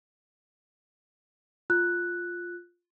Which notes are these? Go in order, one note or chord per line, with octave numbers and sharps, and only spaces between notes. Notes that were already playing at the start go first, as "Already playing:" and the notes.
F4 F#6